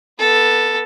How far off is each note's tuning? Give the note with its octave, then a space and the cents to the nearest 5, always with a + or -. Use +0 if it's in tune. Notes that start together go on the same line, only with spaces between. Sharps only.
B3 -15 A4 +0